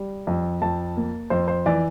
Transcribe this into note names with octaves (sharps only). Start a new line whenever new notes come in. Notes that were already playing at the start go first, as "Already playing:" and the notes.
Already playing: G3
F2
F2 A5
A#3
F2 C5
C5
E3 D5